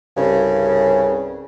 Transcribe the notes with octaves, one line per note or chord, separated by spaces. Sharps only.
C2 G2 C#3